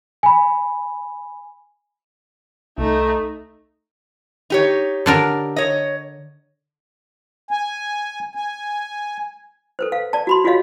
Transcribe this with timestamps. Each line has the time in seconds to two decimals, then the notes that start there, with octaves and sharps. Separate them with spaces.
0.23 G#5 B5
2.78 C2 A3 D#4
4.50 D#4 G4 C#5
5.06 D3 D4 A#4
5.56 C#5 D#5
7.51 G#5
8.35 G#5
9.79 A4 B4 C5
9.92 F5
10.13 D5 A5
10.27 F#4 B5 C6
10.44 F4 F#4 G#4 C#5 D#5 F5